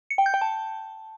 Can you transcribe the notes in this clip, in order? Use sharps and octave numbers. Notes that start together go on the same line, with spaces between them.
C#7
G5
G6
G5
A5